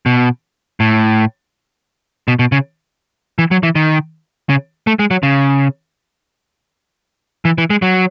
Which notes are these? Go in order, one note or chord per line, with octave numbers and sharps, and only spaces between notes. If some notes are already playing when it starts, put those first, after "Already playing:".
B2
A2
B2
B2
C#3
E3
F#3
E3
D#3
C#3
A3
G#3
F#3
C#3
E3
E3
G#3
F#3